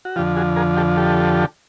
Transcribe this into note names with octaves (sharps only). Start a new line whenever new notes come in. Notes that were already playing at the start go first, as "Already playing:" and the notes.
F#4
F2 D3 F3 F4 G4
F#4 G#4
G#4 A#4
G4 A4
G4 A4